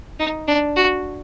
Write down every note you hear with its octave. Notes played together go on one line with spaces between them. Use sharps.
D#4
D4
F#4